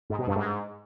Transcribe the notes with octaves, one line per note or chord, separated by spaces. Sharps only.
G#2
B2
G2
G#2